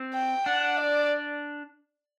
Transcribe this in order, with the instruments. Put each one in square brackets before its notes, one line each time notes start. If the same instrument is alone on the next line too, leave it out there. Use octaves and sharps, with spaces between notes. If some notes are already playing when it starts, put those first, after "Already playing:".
Already playing: [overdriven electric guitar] C4
[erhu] G5
[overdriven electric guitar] D4 [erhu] F#5
[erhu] D5